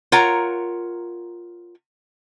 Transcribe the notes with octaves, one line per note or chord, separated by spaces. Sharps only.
F4 A#4 C#5 F#5 A#5